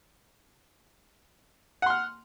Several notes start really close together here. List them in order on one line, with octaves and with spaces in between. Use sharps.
F#5 C6 F6